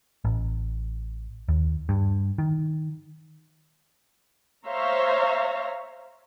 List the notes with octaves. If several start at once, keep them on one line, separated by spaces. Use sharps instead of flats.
A1
D#2
G2
D#3
C5 C#5 E5 F5 A#5